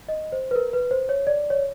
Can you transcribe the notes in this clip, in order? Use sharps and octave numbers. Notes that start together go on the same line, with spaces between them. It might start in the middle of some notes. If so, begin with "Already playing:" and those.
D#5
C5
B4
A#4
B4
C5
C#5
D5
C#5